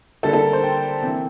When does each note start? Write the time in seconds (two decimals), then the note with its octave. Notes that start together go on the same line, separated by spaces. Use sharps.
0.23 D3 G3 A#3 A4
0.33 A4
0.43 A#4
0.53 C5
0.63 G5
1.03 C3 E3 A#3